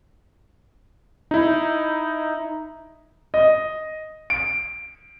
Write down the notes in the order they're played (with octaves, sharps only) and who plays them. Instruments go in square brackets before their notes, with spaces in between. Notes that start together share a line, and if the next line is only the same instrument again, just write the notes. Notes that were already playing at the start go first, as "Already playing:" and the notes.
[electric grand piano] D#4 E4
[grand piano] D#5
D7